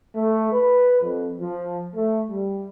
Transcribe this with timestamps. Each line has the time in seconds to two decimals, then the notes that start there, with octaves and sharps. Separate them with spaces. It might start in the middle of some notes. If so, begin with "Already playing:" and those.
0.16 A3
0.52 B4
1.02 F2
1.41 F3
1.94 A3
2.30 G3